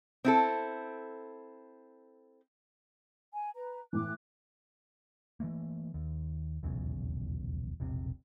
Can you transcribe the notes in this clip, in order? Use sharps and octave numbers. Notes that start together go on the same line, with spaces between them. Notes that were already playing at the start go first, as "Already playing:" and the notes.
C4 E4 A4
G#5
B4 A#5
A2 E3 D6 F#6
E3 F#3 A3 A#3
D#2
D#1 B1 E2 C#3
E1 A#1 C3